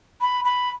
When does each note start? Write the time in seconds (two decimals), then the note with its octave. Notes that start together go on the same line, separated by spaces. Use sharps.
0.21 B5
0.45 B5